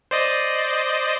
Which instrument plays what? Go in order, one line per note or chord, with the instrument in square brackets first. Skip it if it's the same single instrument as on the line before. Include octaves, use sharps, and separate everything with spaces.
[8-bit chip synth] C5 D5 D#5